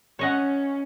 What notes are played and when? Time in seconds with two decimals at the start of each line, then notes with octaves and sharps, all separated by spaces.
0.19 C#4 C#5 D#5 F#5